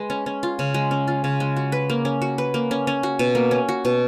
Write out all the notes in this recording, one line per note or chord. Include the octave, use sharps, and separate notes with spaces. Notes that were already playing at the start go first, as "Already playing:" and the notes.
Already playing: G#3 B4
C#4
C#4
F4
C#3
G#3
C#4
F4
C#3
G#3
F#4
B4
A#3
C#4
F#4
B4
A#3
C#4
C#4
F#4
B2
A#3
C#4
F#4
B2